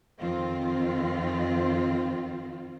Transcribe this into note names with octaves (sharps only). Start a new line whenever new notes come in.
F2 D#3 C4 F4